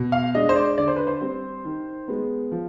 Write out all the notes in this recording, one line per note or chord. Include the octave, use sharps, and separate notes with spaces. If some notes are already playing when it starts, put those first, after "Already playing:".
Already playing: B2
F5
G#3 D4 D#5
C5
D5
D3 D5
C5
B4
C5
G3 C4
D#3
G#3 B3
F3